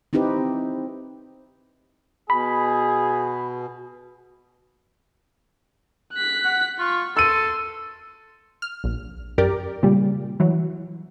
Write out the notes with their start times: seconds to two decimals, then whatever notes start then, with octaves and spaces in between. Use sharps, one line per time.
0.13 C4 D#4 E4 G4 B4
2.30 B2 G#4 B5
6.14 F#6 B6
6.45 F#5
6.79 F4 C#6
7.17 A4 C6 E6 D#7
8.62 F6
8.84 A#1
9.38 F#2 G4 A#4 D5
9.83 A#2 C#3 G3
10.40 E3 F#3